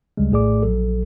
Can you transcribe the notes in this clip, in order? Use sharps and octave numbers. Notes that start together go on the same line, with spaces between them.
D2 C#3 G3 G#3
A#1 A2 A3 G#4 D5 D6
A#1 F#3 A4